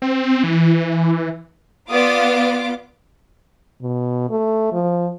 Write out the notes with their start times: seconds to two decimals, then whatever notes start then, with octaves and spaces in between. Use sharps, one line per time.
0.02 C4
0.43 E3
1.89 B3 F4 D5 D6 D#6
3.82 B2
4.30 A3
4.73 F3